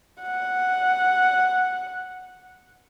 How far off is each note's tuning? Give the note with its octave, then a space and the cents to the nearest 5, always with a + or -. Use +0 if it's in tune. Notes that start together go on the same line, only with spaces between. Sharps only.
F#5 -5